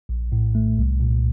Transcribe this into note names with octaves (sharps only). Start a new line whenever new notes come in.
A#1
A2
A3
C2
A#2